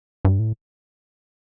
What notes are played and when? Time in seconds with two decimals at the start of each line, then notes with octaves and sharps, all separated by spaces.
0.25 G2
0.39 A2